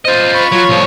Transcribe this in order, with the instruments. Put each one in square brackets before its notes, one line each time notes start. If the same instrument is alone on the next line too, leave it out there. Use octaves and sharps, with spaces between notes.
[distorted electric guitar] F4 D#5 [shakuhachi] C5
[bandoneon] B5 C#6
[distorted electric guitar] F#3 [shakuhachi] F4 [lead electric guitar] C#5
[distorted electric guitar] C2 A2 [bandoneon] F3